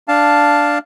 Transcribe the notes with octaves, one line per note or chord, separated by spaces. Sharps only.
D4 F5 A5